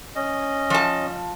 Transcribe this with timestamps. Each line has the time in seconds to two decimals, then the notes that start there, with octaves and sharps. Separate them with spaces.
0.15 C#4 D#5
0.70 F3 A5